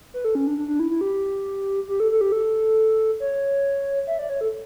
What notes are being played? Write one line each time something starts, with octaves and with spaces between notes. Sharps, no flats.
B4
A4
C#4
D4
D4
D4
E4
E4
G4
G4
A4
A4
G4
A4
C#5
E5
D5
C#5
A4